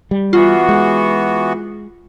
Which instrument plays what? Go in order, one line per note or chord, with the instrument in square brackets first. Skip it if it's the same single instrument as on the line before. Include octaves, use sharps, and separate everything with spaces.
[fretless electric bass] G3
[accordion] E3 B3 F#4 [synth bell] F4
[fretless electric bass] G#3